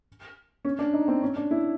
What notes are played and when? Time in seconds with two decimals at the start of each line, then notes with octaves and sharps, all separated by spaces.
0.65 C#4
0.79 D4
0.94 D#4
1.08 C4
1.23 C#4
1.36 D4
1.51 E4